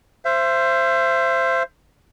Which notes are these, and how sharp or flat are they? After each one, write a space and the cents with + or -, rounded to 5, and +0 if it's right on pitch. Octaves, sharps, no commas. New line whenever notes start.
C5 +0 E5 +35